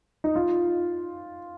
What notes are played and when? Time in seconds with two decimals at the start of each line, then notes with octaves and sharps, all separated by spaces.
0.24 D#4
0.36 F4